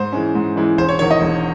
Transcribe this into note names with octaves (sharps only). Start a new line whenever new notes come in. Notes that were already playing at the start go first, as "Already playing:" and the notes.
Already playing: G#2 C5
E3 G#3 C#4
G#2
E3 G#3 C#4
E1 C5
C#5
E2 D#3 C#5
D#5
E1